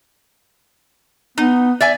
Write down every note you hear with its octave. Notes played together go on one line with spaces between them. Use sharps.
B3 D#4
D5 E5 G#5